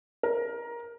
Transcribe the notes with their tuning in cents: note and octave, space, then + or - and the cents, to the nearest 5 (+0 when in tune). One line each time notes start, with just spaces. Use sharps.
A#4 +15